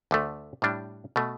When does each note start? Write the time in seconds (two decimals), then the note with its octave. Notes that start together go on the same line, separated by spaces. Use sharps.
0.11 D2 D3 A3
0.62 A2 G3 D4
1.16 B2 A3